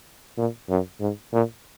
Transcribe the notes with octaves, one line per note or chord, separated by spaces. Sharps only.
A#2
F#2
G#2
A#2